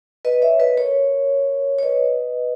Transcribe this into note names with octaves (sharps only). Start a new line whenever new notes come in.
B4 D#5
C#5 E5
B4 D#5
A#4 C#5
C#5
B4 D#5